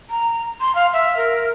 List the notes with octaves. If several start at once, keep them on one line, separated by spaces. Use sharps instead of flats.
A#5
C6
F5
E5
A#4